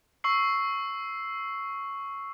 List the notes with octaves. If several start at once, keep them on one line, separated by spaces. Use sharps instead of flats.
C#6 E6 C7